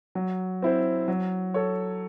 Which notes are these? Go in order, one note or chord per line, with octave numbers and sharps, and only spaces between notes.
F#3
C4 E4 C5
F#3
A4 C#5